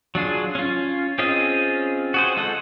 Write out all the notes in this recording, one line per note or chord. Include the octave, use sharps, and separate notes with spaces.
F#3 D4 F4 G#4
C#4 F4
C4 C#4 F4 G#4 D#5
F#4 G#4 C5
G#3 F4 A4 F#5